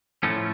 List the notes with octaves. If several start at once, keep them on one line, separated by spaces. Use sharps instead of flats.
A2 F3 A3 C#4